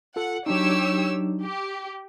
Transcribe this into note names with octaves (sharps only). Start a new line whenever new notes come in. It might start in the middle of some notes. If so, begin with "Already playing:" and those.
F4 A4 F#5
F#3 D4 D#4 G4 C#5 E6
G4